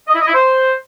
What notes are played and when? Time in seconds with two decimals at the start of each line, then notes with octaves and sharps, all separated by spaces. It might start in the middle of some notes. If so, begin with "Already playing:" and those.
0.08 D#5
0.15 E4
0.21 D#5
0.28 E4
0.34 C5